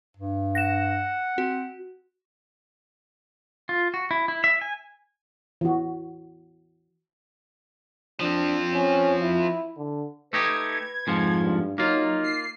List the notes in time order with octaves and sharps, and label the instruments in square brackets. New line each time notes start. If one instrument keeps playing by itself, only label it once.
[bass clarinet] G2
[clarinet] F#5 [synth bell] A#6 E7
[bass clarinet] C4 [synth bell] F#4
[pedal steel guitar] F4
F#4
E4
E4
E5
G#5
[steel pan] E3 F#4
[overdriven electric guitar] F3 C4 [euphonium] D4
[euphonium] C#4
E4
D3
[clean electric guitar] A3 D#4 G4 [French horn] B4 [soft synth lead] G#6
[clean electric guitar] F2 G#2 F3
[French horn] G2
[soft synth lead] F#3 [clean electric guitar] A#3 F4 [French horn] D#4
[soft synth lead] C7